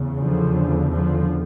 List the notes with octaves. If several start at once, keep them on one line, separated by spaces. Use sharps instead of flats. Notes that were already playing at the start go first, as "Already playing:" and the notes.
Already playing: E2 C#3
D3 F3
D3 F3